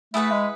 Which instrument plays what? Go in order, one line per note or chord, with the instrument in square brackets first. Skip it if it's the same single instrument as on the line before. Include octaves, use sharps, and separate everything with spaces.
[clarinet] A3 [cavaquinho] E4 G#4 B4 F#5
[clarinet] G#3